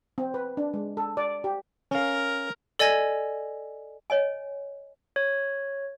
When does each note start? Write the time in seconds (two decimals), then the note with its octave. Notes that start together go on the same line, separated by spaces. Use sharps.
0.18 C4
0.34 B4
0.57 D4
0.74 G#3
0.97 A4
1.17 D5
1.44 G4
1.91 C#4 A#4 F5
2.79 A4 D5 D#5 G#5 G#6 A#6
4.10 C#5 D#5 G#5
5.16 C#5